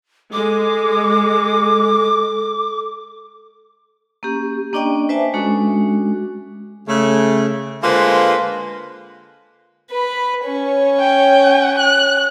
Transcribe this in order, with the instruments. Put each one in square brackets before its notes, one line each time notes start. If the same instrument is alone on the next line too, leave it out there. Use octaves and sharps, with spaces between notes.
[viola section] G#3 [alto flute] A4 [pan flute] D6
[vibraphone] A#3 C#4 G4
A#3 C#4 D4 D5 D#5 G5
B4 C5 D5 E5 G#5 A5
G#3 C#4 D4 F#4 A4
[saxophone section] C#3 A3
D3 G#3 A#3 F4 B4 C5
[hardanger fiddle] B4 B5
C#4 C#5
[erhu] G5
F#6